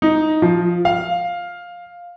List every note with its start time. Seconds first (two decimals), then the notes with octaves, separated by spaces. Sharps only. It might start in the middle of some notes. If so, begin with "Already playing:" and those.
0.02 D#4
0.42 F3
0.85 F5